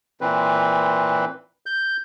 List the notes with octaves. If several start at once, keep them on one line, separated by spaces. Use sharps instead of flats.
A#2 E3 C4 B4
G6